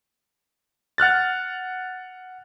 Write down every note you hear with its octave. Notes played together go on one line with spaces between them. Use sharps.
F#5 F6 F#6 A6